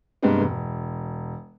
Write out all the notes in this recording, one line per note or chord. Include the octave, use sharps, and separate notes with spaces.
G2 C3 G#3 A#3 B3
E1